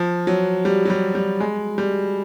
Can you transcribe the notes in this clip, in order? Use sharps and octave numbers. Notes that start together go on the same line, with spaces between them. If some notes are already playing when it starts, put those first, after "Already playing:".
Already playing: F3
F#3
G3
F#3
G3
G3
G#3
G3